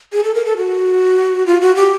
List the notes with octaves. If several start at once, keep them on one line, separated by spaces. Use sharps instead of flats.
G#4
A4
A#4
A4
F#4
F4
F#4
G4